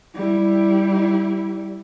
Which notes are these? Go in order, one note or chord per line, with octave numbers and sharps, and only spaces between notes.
G3 E4